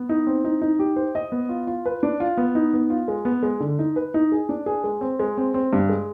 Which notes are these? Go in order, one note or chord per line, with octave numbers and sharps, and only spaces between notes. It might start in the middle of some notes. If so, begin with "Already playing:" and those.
Already playing: B3
D#4
C4
D#4
D#4
G4
C5
D#5
B3
F4
F4
B4
D4
F4
B3
D#4
B3
F4
G#3
B3
G#3
D3
D#4
B4
D#4
G#4
D4
G#4
G#3
C4
G#3
C4
C4
G2
G#3